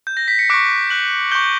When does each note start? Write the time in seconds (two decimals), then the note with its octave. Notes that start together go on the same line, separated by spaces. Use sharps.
0.07 G6
0.17 A#6
0.28 B6
0.39 C#7
0.50 C#6 D6 F#6 D7
0.90 F#6 F#7
1.31 C#6 G6 G7